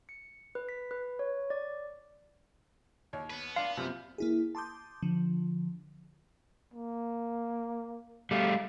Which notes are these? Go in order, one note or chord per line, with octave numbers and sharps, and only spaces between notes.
C#7
B4
B6
B4
C#5
D5
D#2 C#5
B3 B4
D4 F5 C6
F#2 C3 F3
A#3 E4 G#4
A5 C6 D6 D#6 G6
D3 F3
A#3
G3 A3 F5